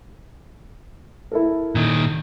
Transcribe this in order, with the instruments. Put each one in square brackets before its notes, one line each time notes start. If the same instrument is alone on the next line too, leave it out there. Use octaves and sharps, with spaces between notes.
[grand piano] E4 A4 A#4
[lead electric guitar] A#2 D#3